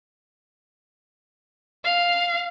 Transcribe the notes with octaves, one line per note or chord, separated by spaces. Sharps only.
F5